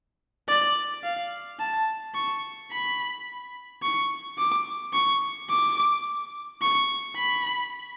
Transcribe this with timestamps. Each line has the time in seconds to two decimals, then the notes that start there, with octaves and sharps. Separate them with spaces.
0.48 D5
1.04 F5
1.60 A5
2.15 C#6
2.72 B5
3.82 C#6
4.38 D6
4.94 C#6
5.49 D6
6.62 C#6
7.16 B5